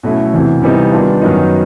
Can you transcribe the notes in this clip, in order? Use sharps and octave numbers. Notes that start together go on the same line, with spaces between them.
B2 F#3 A3 C#4 E4
E2 C3 E3
C3 E3 G3 B3 D#4
D#3 G3 B3 D4 F4
F#2 D#3 F#3 B3 D#4